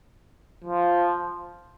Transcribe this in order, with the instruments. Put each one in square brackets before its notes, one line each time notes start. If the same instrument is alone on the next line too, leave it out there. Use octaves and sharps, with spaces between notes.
[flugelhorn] F3